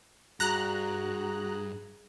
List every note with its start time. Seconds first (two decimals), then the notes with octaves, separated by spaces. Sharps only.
0.40 G2 F#4 G#4 A#5 F#6